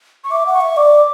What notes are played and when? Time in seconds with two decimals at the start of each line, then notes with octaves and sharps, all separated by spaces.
0.24 C#6
0.31 E5 D6
0.47 F#5
0.54 C#6
0.61 E5
0.77 D5 D6